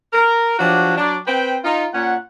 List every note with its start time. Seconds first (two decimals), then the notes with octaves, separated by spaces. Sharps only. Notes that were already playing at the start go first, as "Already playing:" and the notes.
0.13 A#4
0.59 F3 F#3 D4 F#4 G4 C#5
0.97 F#3 D4 D5
1.27 C4 B4 C5 G5
1.64 D#4 F4
1.93 A#2 C#4 F#5